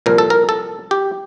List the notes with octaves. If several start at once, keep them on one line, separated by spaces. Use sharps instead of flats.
C2 A#2 F3 A#4
A4
A#4
A4
G4